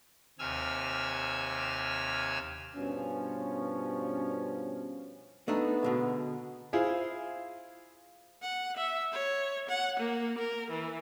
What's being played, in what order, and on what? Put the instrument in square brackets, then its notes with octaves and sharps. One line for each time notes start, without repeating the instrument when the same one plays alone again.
[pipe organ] D#2 C3 G#5 E6 F6
[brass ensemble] G2 B2 F3 B3 C#4
[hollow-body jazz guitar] A3 D4 D#4 [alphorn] B3
[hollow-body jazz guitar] B2 D3 G#3
[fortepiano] E4 F4 G#4 C5
[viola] F#5
E5
C#5
F#5
A#3
A#4
E3